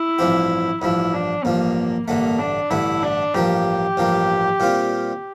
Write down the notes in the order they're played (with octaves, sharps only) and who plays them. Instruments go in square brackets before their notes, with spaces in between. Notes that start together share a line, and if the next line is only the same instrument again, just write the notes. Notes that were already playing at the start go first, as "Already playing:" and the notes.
Already playing: [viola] E4
[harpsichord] A1 G2 F3 C4 G4
[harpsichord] A1 G2 F3 [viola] E4
[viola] D4
[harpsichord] A1 G2 F3 [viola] A#3
[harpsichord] A1 G2 D3 A3 [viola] A#3
[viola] D4
[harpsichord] A1 G2 D3 A3 [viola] E4
[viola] D4
[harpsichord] A1 G2 F3 A#3 [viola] G4
[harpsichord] A1 G2 F3 A#3
A#2 G3 C4 F4